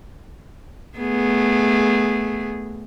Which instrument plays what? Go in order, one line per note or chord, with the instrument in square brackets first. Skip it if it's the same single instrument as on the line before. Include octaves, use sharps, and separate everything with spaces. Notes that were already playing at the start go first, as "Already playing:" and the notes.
[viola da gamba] A3 B3 G#4